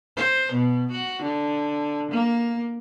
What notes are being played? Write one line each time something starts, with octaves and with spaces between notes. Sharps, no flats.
C5
B2
F#4
D3
A#3